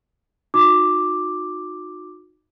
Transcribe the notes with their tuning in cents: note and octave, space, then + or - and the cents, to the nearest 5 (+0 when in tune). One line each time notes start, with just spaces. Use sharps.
D#4 -10 F#4 -35 D6 +0